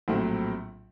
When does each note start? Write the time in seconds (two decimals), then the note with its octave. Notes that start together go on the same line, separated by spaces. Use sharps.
0.08 A#1 A2 F#3 A3 C4